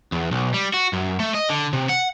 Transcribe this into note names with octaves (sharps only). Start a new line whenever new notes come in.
E2
B1
G3
F#4
F#2
A3
D#5
D3
C3
F#5